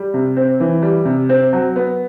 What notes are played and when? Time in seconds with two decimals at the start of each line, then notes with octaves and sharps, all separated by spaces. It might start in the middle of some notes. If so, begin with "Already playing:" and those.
Already playing: G3
0.14 C3
0.36 C4
0.60 E3
0.82 G3
1.05 C3
1.29 C4
1.53 F#3
1.76 B3